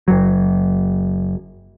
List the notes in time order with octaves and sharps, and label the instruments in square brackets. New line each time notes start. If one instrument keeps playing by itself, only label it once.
[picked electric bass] F#1 F#3